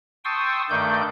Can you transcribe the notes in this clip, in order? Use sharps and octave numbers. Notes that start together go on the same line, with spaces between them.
G5 A5 C6 C#6 D#6 E6
G2 D#3 A3 D5 G6